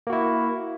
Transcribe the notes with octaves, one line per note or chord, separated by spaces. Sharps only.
A#3 E4 F#4